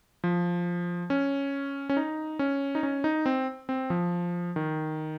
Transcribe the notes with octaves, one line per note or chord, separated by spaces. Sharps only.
F3
C#4
C#4
D#4
C#4
D#4
C#4
D#4
C4
C4
F3
D#3